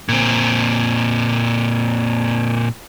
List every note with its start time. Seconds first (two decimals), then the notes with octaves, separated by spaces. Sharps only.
0.09 A#2 C4